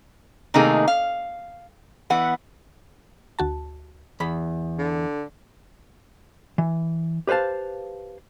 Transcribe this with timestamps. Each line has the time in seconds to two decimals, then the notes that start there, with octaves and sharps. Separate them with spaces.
0.54 C3 D#3 A3 A#3 D#4 G#4
0.88 F5
2.10 E3 B3 F#5
3.39 D2 F#4 A5
4.20 E2 B5
4.78 D3
6.58 E3
7.27 G4 B4 C5 F5 A5